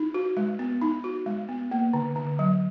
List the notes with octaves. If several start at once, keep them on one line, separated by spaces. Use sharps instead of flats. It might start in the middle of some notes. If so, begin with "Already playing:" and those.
Already playing: D#4
F#4
G#3
B3
D#4
F#4
G#3
B3
A#3
D3
D3
F#3